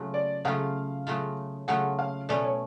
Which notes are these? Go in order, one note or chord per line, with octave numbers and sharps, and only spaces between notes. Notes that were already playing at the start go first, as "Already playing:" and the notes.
Already playing: C#3 F#3 A3 F4
D5
C#3 F#3 A3 F4 F5
C#3 F#3 A3 F4
C#3 F#3 A3 F4 F#5
F5
B2 A3 C#4 D5
C#5